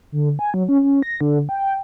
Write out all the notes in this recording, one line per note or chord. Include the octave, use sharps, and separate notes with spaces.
D3
G#5
F#3
C#4
C#4
A#6
D3
G5